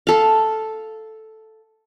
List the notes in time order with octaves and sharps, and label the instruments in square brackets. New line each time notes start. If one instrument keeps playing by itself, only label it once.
[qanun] A4 F5